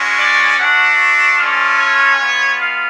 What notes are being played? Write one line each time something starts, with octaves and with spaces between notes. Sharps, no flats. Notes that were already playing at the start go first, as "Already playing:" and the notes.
Already playing: G#3 C#4 F#4
D5
A3 D4 F#4 F#5
A3 C#4 F4 D5
C#5
G#3 B3 F4
F5